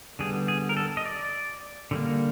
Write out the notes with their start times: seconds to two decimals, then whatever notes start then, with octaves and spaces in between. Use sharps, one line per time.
0.19 D3 G3 B3 G#4
0.48 G#4
0.69 A#4
0.77 A4
0.97 D#5
1.06 D5
1.91 D3 G3 A#3